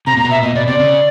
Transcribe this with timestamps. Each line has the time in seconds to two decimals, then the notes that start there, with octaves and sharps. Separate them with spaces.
0.06 C3 A#5
0.17 A#2 A#5
0.24 B2
0.31 E5
0.42 A#2 D#5
0.55 B2 D5
0.67 C3 D5
0.79 C#3